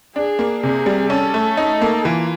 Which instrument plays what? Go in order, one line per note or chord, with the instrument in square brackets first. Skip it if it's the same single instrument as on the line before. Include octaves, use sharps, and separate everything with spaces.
[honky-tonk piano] D4 [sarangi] G#4
[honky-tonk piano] A#3
[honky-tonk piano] C3 [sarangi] G#4
[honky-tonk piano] G3
[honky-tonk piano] C#4 [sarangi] A4
[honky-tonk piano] A3
D#4
A#3
[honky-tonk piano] E3 [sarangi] F4